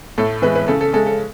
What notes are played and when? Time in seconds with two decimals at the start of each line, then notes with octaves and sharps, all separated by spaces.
0.18 A2 A4
0.42 E3 G#3 B4
0.55 B4
0.68 C#3 A4
0.81 A4
0.93 G#3 A4
1.07 A4